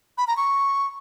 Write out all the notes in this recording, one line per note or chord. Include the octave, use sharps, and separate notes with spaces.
B5
A#5
C#6